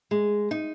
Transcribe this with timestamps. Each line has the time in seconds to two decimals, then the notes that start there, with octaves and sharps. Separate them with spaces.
0.11 G#3
0.51 D#4